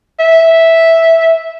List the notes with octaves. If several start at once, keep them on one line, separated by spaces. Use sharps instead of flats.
E5